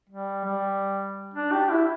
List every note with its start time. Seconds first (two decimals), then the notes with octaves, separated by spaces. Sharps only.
0.09 G3
0.44 G3
1.34 D4
1.52 G4
1.70 E4